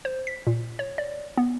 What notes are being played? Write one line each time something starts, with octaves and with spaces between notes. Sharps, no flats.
C5
B6
A#2
C#5
D5
B3